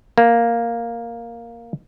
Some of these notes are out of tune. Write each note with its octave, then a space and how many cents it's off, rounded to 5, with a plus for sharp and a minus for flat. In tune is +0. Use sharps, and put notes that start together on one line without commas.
A#3 +0